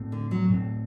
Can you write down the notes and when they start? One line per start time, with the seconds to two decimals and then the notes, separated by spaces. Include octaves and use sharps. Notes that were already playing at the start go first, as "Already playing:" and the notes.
Already playing: A2 A3 C4
0.12 D3
0.31 F#3
0.50 A2 A3 C4